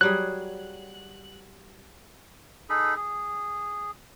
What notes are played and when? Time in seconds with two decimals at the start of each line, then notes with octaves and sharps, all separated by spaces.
0.01 F#3 G3 G#4 F#6
2.70 D#4 G#4 A4 B5
2.96 G#4